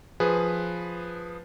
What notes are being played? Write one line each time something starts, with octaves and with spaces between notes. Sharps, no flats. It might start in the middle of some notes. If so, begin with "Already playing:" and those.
F3 G#4 B4